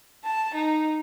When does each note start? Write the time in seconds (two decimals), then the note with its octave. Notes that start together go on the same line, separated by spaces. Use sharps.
0.24 A5
0.55 D#4